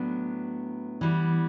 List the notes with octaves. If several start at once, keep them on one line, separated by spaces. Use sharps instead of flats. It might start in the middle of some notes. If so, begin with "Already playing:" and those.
Already playing: A2 F#3 B3 D4
E3 G3 B3